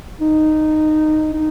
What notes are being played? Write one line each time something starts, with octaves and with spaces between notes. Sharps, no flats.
D#4
D#4